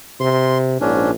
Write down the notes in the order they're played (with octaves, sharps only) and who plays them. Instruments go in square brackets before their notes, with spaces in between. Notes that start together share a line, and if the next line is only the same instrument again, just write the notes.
[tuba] C3 [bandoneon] C6
[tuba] A#1 [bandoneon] G#2 C#4 D4